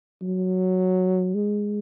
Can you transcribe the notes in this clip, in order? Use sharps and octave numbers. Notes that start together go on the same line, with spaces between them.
F#3
G#3